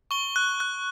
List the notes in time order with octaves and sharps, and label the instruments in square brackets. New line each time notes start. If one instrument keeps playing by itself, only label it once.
[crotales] C#6 G7
F#6
F#6